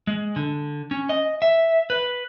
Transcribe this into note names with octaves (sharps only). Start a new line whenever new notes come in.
G#3
D3
C#4
D#5
E5
B4